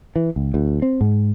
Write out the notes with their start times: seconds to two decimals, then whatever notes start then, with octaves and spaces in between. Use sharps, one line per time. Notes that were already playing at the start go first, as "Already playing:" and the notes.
0.16 E3
0.36 C#2
0.54 D2
0.82 C4
1.01 G#2